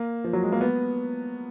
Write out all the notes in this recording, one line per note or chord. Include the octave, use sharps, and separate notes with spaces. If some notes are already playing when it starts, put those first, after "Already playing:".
Already playing: A#3
F3
F#3
G#3
A#3
B3